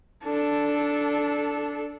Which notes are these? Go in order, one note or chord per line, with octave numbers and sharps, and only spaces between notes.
D4 A4